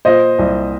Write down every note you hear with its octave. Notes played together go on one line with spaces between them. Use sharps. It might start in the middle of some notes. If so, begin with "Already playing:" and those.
A#2 C5 D#5
C2